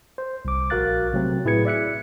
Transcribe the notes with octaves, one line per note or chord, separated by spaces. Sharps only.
C5
C2 D6
A#1 F#4 A#4 F5 F#6 A6
C3 F#3 A3 C4
A2 E4 G#4 B4 G#6 C#7
D5 E5 F#6 C#7